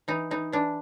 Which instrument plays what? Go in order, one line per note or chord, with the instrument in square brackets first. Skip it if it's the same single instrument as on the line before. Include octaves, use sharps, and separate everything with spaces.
[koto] E3 D#4
E3 D#4
E3 D4